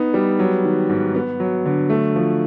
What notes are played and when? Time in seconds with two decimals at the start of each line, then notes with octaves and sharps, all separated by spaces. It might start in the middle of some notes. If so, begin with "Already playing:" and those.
Already playing: B3 D#4
0.14 G3
0.39 F#3
0.64 D#3
0.89 G#2
1.15 B3
1.40 F#3
1.65 D3
1.90 A3
2.15 F3